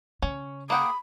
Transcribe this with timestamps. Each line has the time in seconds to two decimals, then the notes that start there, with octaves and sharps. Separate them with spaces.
0.22 C#3 C#4
0.70 A#3 F#5 G5 B5 D#6